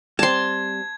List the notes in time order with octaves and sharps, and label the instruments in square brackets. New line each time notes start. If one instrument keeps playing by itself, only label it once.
[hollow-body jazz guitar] G3 C4 [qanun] A5 C6 [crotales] G#6